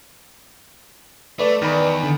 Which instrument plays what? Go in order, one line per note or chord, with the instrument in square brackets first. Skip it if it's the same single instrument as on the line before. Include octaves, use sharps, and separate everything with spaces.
[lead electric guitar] A3 [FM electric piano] B4 D5
[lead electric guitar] E2 [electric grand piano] D#3 B5
[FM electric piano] D3